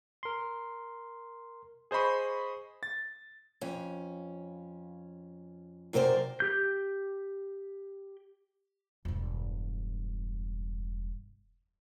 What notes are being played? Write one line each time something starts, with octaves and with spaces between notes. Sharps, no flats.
A#4 C6
G#4 C5 D#5 B5 C#6
A6
F2 C#4
F#2 C3 A#4 C5 D5
G4 G6
E1 G2